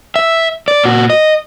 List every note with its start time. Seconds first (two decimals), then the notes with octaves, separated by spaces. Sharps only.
0.16 E5
0.68 D5
0.84 A#2 F#4
1.10 D#5